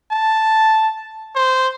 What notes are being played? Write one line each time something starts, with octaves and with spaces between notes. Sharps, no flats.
A5
C5